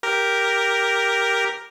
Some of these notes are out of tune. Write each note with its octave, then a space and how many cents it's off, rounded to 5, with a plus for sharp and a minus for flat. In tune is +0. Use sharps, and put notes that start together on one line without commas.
G4 +0 A#4 +0